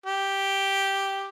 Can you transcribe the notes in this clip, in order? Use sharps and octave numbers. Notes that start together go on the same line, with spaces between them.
G4